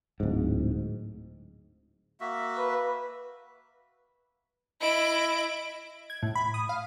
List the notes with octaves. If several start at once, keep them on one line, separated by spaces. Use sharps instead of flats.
D1 G#2
A#3 F#4 E5
B4
E4 D#5 D7
G#6
A2
B5
D#6
F5